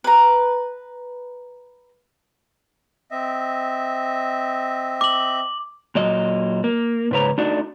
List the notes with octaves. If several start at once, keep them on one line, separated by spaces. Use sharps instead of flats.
B4 A#5
C4 D#5 E5
D6 F#7
A#2 F#3 D#5
A#3
G#2 C#3 B4 C#5 A#5
A3 D4 D#4 F#4